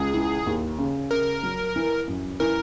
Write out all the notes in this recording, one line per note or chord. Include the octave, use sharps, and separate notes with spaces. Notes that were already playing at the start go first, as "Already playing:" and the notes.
Already playing: C#2 G#4
E3
D#2
C#3
C#3 A#4
F#3
E3
F#2
E3 A#4